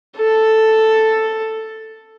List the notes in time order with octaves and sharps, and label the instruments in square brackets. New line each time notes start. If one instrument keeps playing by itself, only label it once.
[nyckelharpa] A4